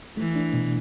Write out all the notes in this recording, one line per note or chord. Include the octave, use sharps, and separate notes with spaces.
E3 A3
D4
B2